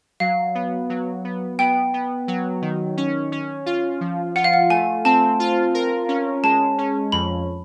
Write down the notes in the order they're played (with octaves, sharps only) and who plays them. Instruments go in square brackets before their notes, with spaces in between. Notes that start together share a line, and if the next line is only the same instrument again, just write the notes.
[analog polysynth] F#3 [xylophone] F5
[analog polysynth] B3
F#3
B3
[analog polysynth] B3 [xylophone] G5
[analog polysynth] B3
F#3
D#3
C#4
C#4
F4
F3
[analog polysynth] F4 [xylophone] F#5
[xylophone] F5
F#5
[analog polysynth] A3 [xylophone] G#5
[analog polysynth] C4 [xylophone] A5
[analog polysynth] F4
A#4
C#4
[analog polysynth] G#3 [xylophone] A5
[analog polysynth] C#4
[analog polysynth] F2 [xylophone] B5